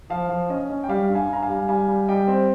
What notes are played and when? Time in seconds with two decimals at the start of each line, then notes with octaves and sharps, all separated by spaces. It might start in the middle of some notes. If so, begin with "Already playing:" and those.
0.10 F3 F5
0.29 F3
0.50 C#4 D#5
0.70 C#4
0.84 G5
0.89 G3 F5
1.09 G2
1.15 F5 G#5
1.30 G2 A#5
1.43 F5 G#5
1.48 G3
1.68 G3 F5 G#5
1.88 G3
2.08 G3 D#5 G5
2.28 C4